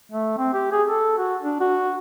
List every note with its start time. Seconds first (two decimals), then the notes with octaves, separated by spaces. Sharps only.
0.12 A3
0.38 C4
0.54 G4
0.72 G#4
0.89 A4
1.18 F#4
1.43 D4
1.60 F#4